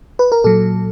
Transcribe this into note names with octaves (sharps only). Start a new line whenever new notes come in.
B4
A#4
A#2 F#3 A4